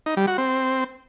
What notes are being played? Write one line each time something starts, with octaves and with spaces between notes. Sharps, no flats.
D#4
G3
F#4
C4